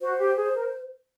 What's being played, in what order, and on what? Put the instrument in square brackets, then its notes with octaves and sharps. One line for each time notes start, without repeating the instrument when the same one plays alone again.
[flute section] F#4 [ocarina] C5
[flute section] G4
G#4
A#4